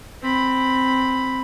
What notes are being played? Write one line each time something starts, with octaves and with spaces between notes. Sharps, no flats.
C4 B5